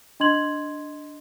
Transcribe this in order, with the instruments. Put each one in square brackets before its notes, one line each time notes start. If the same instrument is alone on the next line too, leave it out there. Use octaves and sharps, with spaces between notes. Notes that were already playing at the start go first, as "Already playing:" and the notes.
[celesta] D4 D#5 C6 G#6 F#7